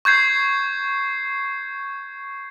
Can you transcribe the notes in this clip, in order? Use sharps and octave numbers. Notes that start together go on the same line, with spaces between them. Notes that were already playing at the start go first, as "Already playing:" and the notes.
C#6 G6 G#6 C7